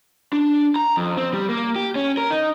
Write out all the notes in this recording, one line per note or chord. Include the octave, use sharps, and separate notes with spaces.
D4
A#5
F2
C4
G3
A#3
G4
C#4
A#4
D#4